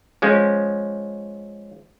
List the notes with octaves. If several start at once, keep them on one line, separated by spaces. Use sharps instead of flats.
F3 G#3 C#4